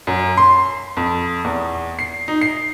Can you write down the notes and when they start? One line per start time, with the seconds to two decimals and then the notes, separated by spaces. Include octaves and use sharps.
0.07 F#2
0.37 C6
0.97 F2
1.45 E2
1.99 C7
2.28 D#4
2.41 C7